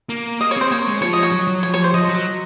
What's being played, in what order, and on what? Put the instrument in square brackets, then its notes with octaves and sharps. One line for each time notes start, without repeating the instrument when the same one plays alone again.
[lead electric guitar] A#3
[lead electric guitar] A#3 [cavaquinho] D#5
[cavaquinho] C#5
[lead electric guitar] C4 [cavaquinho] C5
[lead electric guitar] A#3 [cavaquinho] C#5
[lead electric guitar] G#3
[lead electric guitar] F3 [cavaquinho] C#5
[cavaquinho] D#5
C#5
[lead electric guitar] F#3
F#3
[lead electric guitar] F3 [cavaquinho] C#5
[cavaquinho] C#5
C5
[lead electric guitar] F3 [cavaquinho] D#5
[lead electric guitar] F#3